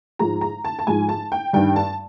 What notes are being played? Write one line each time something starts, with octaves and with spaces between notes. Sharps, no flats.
G#2 F3 G#3 A#5
A#5
A5
A5
G#2 F3 G#3 G#5
A5
G5
G2 D#3 G3 G5
A5